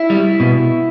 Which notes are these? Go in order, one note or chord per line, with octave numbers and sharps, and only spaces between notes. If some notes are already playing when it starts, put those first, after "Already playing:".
Already playing: E4
G3
B2